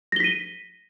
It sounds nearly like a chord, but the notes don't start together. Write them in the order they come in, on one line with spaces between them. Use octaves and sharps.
A#6 G7 B6 D#7